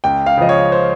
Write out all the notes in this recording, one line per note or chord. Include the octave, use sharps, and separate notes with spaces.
C#2 G5
F5
C#3 F3 D#5
C#5
C5